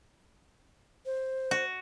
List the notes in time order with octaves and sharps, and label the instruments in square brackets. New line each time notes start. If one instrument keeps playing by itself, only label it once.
[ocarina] C5
[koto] F#4